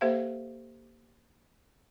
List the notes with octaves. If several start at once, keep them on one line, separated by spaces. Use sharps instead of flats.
A#3 G4 A4 C5 E5 F5